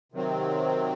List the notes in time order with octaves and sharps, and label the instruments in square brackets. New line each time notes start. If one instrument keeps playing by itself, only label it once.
[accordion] C3 D#3 F#3 C4